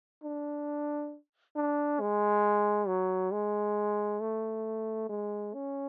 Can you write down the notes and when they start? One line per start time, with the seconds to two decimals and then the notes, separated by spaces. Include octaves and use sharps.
0.23 D4
1.56 D4
2.00 G#3
2.88 F#3
3.32 G#3
4.20 A3
5.09 G#3
5.54 C#4